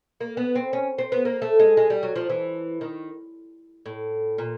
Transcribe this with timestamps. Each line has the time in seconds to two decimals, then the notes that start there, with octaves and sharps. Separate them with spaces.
0.21 A#3
0.37 B3
0.55 C4
0.73 C#4
0.98 C4
1.12 B3
1.25 A#3
1.42 A3
1.60 G#3
1.77 G#3
1.90 G3
2.03 F#3
2.16 F3
2.30 E3
2.81 D#3
3.86 A2
4.38 A#2